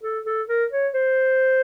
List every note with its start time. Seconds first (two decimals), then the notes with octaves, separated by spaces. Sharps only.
0.04 A4
0.26 A4
0.49 A#4
0.72 C#5
0.94 C5